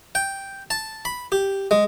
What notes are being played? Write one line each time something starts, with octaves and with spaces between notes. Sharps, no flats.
G5
A5
B5
G4
G#3